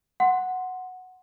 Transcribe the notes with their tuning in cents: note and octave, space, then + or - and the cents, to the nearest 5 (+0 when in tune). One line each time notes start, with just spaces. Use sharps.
F#5 +0 C6 +0